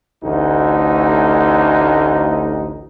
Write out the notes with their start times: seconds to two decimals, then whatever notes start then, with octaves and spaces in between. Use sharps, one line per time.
0.23 A1 D2 D#4